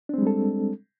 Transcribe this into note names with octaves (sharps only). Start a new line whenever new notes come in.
G3 G#3 C4 D4 A4